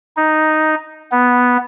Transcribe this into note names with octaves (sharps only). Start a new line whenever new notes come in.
D#4
B3